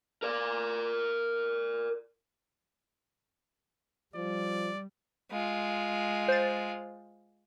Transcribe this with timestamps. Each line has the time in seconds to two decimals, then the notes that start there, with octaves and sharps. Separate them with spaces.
0.23 A#4 D5
4.15 F3 G3 D5
5.31 G#3 F4
6.28 C5 A6